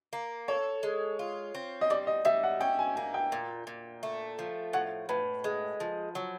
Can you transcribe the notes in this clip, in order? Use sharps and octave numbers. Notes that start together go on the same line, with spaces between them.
A#3
A4 C#5
G#3
F4
C4
D#5
G3 D5
D#5
G3 E5
F#5
C#4 G5
G#5
A#3 G#5
G5
A#2
A#2
A3
F3
A2 F#5
A2 B4
G#3
F3
F#3